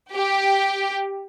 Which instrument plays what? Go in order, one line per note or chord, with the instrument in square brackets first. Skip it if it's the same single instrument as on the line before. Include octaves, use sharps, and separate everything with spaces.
[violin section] G4